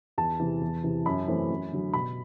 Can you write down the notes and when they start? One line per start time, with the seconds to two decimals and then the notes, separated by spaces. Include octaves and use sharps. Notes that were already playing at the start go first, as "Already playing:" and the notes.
0.18 E2 A5
0.40 C3 E3
0.61 E2
0.84 C3 E3
1.06 F#2 B5
1.28 E3 A3 C4
1.50 F#2
1.73 D3 F#3
1.94 B2 B5